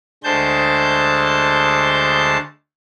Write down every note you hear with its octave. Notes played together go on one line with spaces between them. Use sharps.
D2 D3 G#3 C5 A5 G6